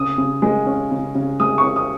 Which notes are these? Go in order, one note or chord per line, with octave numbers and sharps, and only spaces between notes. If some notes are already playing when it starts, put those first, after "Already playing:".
Already playing: C#3 D#6
C#3
G#3
C#4
C#3
C#3
G#3 D#6
C#6
C#4
D#6